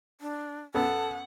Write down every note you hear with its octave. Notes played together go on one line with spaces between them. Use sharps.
D4
F#2 B3 A4 F#5 A5